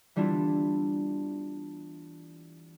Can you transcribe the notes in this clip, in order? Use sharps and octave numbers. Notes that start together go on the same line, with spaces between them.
E3 G3 B3 D4 E4 F4